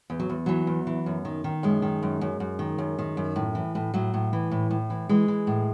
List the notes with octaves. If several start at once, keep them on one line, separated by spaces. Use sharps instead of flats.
E2
F#3
E2
E3 F#3
E2
E3
F#2
D#3
D#3
F#2 G#3
D#3
F#2
F#2
F#2
D#3
F#2
D#3
F#2
A2
E3
A2
A2 F#3
A2
E3
A2
A2
E3
E3 G#3
E3
A2